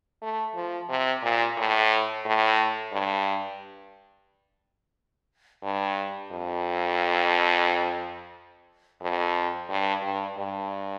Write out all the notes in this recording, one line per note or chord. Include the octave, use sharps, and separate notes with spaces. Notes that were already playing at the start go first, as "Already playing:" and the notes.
A3
F3
C3
A#2
A2
A2
G2
G2
F2
F2
G2
G2
G2